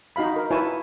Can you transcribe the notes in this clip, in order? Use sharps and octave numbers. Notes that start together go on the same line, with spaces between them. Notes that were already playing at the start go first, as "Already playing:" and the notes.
D#4 F#4 F5 B5
A#4
E4 F4 B4 C#5 G#5 A5